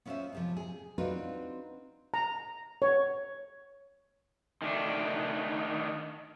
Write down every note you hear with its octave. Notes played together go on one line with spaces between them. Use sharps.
B3 C#4 E4 F4 C5 E5
G#2 C3 F3
G#4
C4 D4 D#4 F4 F#4 B4
A#5
C#5
D#3 A3 D4